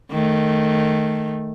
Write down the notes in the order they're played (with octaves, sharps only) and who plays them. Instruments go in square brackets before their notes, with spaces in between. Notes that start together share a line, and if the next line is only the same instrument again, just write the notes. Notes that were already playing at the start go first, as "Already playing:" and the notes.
[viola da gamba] D#3 A3